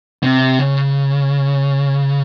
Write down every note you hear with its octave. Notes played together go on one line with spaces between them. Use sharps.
C3
C#3